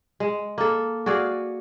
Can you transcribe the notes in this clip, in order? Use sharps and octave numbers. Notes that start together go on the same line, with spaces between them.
G#3
A#3 A4
F#4 G#4 D5 F5